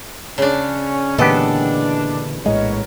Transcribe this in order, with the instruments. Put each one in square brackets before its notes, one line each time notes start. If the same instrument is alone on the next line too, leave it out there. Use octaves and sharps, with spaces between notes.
[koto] C#3 D4 [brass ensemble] C#4
[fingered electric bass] A#2 D3 [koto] E3 A4 [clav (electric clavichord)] G#3 B3 G4 [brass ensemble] D4
[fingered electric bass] A#1 A2 G#3 [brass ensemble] B3 A#4 C#5 [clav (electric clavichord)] D#5